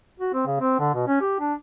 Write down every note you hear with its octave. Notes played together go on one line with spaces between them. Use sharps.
F#4
C4
C#3
C4
D3
B2
C#4
G4
D4